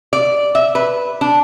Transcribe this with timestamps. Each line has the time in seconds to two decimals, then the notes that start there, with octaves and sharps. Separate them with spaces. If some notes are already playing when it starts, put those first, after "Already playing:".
0.13 D5
0.55 E5
0.75 B4
1.21 D4